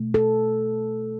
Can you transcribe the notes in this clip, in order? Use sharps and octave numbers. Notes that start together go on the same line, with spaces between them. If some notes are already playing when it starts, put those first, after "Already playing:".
Already playing: B2 A3
A4